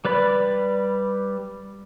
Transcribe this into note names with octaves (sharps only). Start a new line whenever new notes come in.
G3 B4 D5 B5